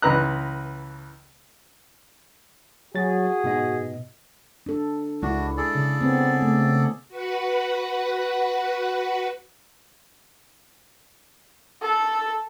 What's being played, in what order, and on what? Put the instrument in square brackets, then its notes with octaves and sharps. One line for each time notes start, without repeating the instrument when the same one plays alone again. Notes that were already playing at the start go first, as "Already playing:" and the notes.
[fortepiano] C#2 E3 B4 A#5 F#6
[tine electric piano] F#3 A6 [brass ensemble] F#4 G#4
[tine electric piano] G#2 B2 D#5
[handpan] D4 A4
[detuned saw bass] C#2 [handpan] G#3 E4 [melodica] D4 F#4
[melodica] G#4 A4 D5
[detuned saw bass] C#3
[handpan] B3 C4
A3
[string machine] F#4 B4 F#5
[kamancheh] A4